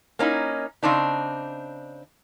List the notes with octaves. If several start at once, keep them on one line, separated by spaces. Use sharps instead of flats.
A#3 C#4 D#4 E4
C#3 C4 D4 D#4